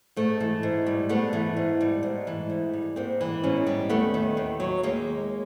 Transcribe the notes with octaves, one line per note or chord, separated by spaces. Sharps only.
G#2 A3
E3
G#2
G3
G#2 A3 B3
E3
G#2
G3
G#2
E3
G#2
G3
G#2 A#3 C4
E3
G#2 B3 C#4
G3
D#2 A3 B3
D#3
D#2
F#3
D#2 G#3 A#3